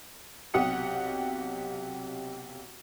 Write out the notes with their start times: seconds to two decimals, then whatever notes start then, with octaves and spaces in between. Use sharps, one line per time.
0.54 B1 C3 G4 F#5 D#6 C#7